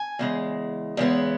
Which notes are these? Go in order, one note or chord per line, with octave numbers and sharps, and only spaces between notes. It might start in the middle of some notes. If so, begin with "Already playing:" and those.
Already playing: G#5
E2 C#3 G#3
E2 C#3 G#3 B3